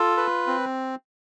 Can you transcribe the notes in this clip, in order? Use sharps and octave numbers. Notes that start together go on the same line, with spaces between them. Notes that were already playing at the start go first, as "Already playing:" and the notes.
Already playing: F4 A4
B4
C4